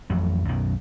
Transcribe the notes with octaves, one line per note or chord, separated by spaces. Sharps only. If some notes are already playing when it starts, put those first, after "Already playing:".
A1 F2 F#3
B1 F#2 B2 D#3